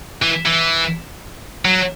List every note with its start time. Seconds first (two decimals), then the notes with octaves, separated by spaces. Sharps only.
0.22 E3
0.46 E3
1.65 F#3